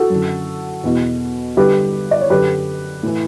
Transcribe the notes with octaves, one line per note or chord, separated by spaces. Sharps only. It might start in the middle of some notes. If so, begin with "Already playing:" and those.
Already playing: F#4 A4
F#2 D3
E2 B2
G2 D3 G4 B4
D5
C#5
F#2 D3 G4 B4
A2 E3